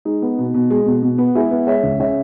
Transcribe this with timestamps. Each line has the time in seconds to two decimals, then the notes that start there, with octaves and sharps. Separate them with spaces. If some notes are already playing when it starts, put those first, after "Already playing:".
0.05 G#3 D#4
0.22 B3
0.38 B2
0.54 B2
0.70 G#3
0.86 B2
1.02 B2
1.18 B3
1.35 G#3 E4 G#4
1.51 B3
1.67 G#3 C#5 E5
1.83 C#2
2.00 C#3 C#5 E5